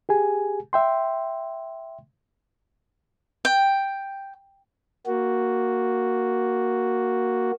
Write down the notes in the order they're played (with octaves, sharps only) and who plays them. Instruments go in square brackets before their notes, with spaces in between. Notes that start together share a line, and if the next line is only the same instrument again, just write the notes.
[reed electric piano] G4 G#4 G#5
E5 G5 C6
[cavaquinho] G5
[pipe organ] A#3 F#4